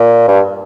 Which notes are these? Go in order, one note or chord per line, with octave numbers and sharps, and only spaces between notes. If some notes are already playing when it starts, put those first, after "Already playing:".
Already playing: A#2
G2